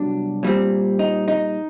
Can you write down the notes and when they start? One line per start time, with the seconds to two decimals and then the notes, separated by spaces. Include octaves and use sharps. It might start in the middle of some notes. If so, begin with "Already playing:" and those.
Already playing: C2 B2 F#3 D4
0.43 A#2 G3 C4
0.99 D#4
1.28 D#4